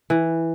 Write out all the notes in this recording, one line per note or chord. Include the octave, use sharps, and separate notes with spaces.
E3